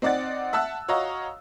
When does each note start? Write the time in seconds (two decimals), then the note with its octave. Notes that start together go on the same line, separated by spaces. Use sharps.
0.02 C4 D#4 D5 F#5 A6
0.53 E5 F#5 A5 E6 F#6
0.88 F#4 C#5 D#5 F5 A#5